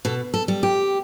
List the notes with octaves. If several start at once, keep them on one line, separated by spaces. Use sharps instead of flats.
B2 A4
A4
G3
G4